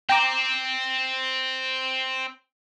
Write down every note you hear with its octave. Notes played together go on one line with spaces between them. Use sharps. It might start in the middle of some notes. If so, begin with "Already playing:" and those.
C4 G5 A#5 D6